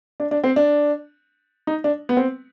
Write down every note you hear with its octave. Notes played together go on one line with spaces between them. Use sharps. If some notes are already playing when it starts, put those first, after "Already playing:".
D4
D4
C4
D4
D#4
D4
B3
C4